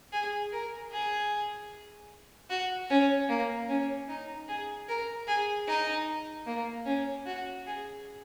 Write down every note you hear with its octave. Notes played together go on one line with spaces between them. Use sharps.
G#4
A#4
G#4
F#4
C#4
A#3
C#4
D#4
G#4
A#4
G#4
D#4
A#3
C#4
F#4
G#4